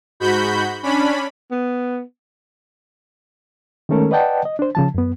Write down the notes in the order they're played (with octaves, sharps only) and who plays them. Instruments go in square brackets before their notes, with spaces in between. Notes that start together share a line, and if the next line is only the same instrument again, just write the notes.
[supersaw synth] G#2 F#4 B5 G6
C#4 D4 B5
[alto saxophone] B3
[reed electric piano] D#3 G#3 A3 C#4 A4 A#4
B4 D5 D#5 F#5 G5 A5
D#5
D4 C5
C#3 F3 A5
F#2 B3